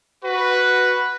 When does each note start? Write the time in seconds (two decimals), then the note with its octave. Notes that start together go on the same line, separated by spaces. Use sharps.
0.23 F#4 B4